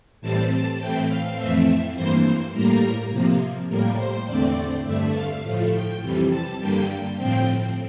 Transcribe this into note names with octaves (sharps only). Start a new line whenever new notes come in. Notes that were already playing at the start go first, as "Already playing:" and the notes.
A2 E3 G3 C4 A5
A5
A2 E3 A3 C4 G5
F5
F2 E3 A3 C4 E5
G2 E3 A#3 C5
A2 G3 A#3 A#4
C3 F3 A#3
A2 G3 A#3 A#4
C5
E2 D3 A3 C4 D5
G2 D3 A3 E5
F5
A2 F3 A3
G5
F2 C3 E3 G3
A5
G2 D3 G3 A#3 G5
A2 F3 C4 G5